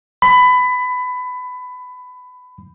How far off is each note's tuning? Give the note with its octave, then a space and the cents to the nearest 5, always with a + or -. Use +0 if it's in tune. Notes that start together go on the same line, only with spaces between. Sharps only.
B5 +20